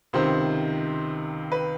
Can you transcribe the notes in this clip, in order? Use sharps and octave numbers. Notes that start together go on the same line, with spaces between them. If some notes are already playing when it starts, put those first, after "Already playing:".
C#2 C3 D#3 C5
B4